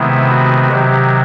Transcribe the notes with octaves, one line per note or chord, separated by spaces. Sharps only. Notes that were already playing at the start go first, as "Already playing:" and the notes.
Already playing: C3 D#3 G#3 B3 E4
F#4
C3 D#3 F#3 G4